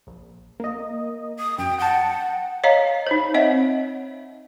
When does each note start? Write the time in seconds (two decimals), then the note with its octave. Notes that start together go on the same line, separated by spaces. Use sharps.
0.07 A#1
0.60 A#3 D#5
1.39 D#6
1.58 F#2 G5
1.79 F#5 G5 A5
2.64 C#5 D#5 F5 A#5
3.07 D#4 C5
3.34 C4 C#5 D#5 E5 F#5